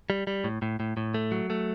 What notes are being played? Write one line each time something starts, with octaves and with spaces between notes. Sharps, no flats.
G3
G3
A2
A2
A2
A2
A3
F#3
A3